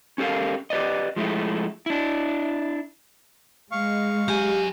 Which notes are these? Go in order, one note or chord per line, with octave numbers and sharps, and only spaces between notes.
C#4 G4 A4 A#4 F5
G4 B4 D5 D#5
F3 G#3 A3 E4
D4 E4
G#3 F5 C#6
F#3 G4 G#5